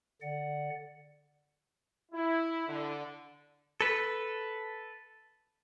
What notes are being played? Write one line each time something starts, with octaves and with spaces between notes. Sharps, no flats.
D3 D5 F#5
E4
D3
A4 B4